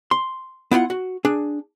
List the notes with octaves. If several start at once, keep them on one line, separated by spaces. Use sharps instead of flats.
C6
B3 E4 F4 F#5
F#4
D4 G#4